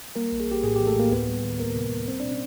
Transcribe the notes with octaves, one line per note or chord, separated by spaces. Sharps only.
G3 A#3 A#4
A#1
G#4
A#1 G4
A2 G#4
E3 G4
A3 A4
A2 A#3 A#4
D2 B3 B4
G3
D#3
D2 A#3 A#4
C3
G3
G3 C4 C5
B2 D4 D5
C#4